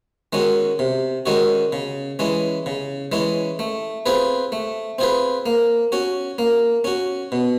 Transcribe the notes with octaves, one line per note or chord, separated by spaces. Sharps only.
D#3 G#3 C#4 F#4
C3
D#3 G#3 C#4 F#4
C#3
E3 G#3 C#4
C#3
E3 G#3 C#4
A3
C4 F4 G#4 B4
A3
C4 F4 G#4 B4
A#3
C#4 F#4
A#3
C#4 F#4
B2